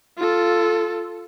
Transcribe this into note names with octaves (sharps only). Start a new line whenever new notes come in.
F4 A4